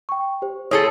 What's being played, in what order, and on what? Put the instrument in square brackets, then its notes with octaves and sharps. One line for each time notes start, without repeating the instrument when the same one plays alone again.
[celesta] G5 C#6
G4 C5
[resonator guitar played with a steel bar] A2 G#4 A4 [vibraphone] C#5 [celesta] D#6 C7 C#7